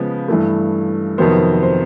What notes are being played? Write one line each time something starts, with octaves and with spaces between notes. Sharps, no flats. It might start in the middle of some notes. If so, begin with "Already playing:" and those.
Already playing: C#3 F3 G#3 B3
G2 E3 A3
F2 C3 D#3 F#3 B3 C5
C5